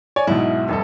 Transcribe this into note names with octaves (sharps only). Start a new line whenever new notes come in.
C#5 D5 G#5
B1 G#2 B2 E4
F1 G2 A4